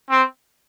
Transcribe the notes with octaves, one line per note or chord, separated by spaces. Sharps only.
C4